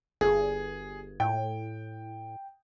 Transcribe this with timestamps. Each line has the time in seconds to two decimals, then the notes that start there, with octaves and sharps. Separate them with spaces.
0.21 G1 G#4
1.20 A2 G5